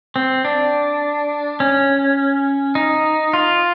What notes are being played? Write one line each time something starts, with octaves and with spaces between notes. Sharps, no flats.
C4
D4
C#4
D#4
F4